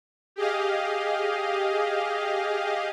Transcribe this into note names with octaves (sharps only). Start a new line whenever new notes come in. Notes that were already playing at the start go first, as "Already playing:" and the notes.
G4 G#4 D#5 F5